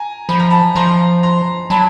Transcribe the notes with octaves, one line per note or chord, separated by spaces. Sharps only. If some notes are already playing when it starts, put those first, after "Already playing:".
Already playing: G#5 A#5
F3 B5
A#5
A5 B5
F3 A#5 C6
A#5 C6
F#3 A5 B5